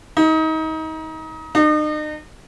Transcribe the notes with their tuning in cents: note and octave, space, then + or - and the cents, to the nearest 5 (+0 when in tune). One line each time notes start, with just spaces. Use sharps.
D#4 +30
D#4 -40